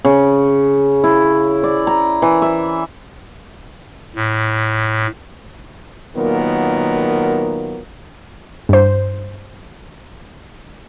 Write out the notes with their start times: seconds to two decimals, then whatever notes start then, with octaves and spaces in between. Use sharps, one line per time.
0.05 C#3
1.04 E4
1.64 D5
1.87 A#5
2.22 E3
2.42 E5
4.16 A2
6.16 A#2 D#3 F#3 A#3 B3 A#4
8.69 G2 C5